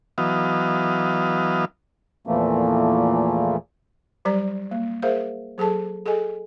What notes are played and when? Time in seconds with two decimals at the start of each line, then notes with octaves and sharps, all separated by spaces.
0.18 E3 F#3 B3 D#5 F5
2.27 E2 A#2 E3 F3 A3 A#3
4.25 F#3 G3 G4 D5 A#5
4.71 A#3
5.02 G#4 A#4 C5 E5 F5
5.58 F#3 G#4 A4 A5
6.06 G#4 A4 D#5 G#5